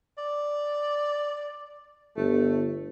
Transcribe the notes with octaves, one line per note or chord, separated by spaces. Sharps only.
D5
G1 A3